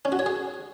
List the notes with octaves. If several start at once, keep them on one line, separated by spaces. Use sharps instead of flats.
C#4
F#4
C#5
G#4